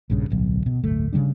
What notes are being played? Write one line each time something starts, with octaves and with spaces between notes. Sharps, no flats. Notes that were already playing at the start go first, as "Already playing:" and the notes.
A#1 G2 C#3
D1 B1
B2
D1 G1 A3
C#3 F3 G3 D4